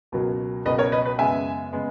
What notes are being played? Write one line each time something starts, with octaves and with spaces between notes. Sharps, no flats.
C#2 B2 F#3 A#3
C#2 B2 F#3 A#3 B4 D#5
A#4 C#5
B4 D#5
B4
F#2 C#3 G#3 B3 E5 G#5
C#3 G#3 B3